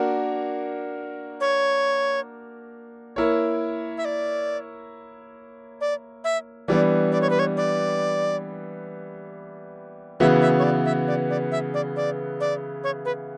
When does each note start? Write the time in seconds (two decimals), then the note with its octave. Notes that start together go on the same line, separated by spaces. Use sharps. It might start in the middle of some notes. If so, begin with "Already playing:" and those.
Already playing: A#3 D4 F#4 A#4
1.41 C#5
3.16 A#3 E4 A#4 C#5
3.98 E5
4.05 D5
5.81 D5
6.24 E5
6.68 E3 G3 B3 D4 D5
7.12 D5
7.21 C#5
7.30 B4
7.39 C#5
7.57 D5
10.20 C#3 E3 B3 F#4 E5
10.42 E5
10.59 C#5
10.63 D5
10.85 E5
11.08 D5
11.30 D5
11.52 E5
11.74 D5
11.96 D5
12.40 D5
12.84 C#5
13.05 B4